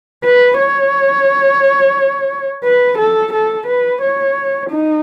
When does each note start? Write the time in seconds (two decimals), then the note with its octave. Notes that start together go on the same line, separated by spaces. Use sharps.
0.24 B4
0.58 C#5
2.64 B4
2.98 A4
3.33 A4
3.67 B4
4.02 C#5
4.70 D#4